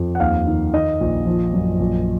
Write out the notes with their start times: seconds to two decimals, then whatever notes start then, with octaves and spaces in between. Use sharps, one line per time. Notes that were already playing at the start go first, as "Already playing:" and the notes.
Already playing: F2
0.15 F#5
0.20 D#2 F5
0.47 D#3
0.73 D#3 D#5
1.01 A#1
1.26 F3
1.53 F#2
1.80 A#1